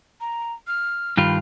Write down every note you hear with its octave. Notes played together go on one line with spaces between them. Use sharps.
A#5
F6
G2 D#3 F4 B5